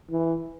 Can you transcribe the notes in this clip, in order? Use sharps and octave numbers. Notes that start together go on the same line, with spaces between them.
E3